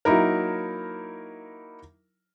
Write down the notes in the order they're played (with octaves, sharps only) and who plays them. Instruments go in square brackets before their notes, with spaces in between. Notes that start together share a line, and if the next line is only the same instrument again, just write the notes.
[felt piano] F#3 A#3 D#4 E4 A#4